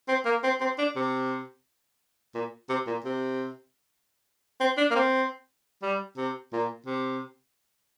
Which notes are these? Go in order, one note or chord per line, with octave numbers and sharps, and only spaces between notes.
C4
A#3
C4
C4
D4
C3
A#2
C3
A#2
C3
C4
D4
A#3
C4
G3
C3
A#2
C3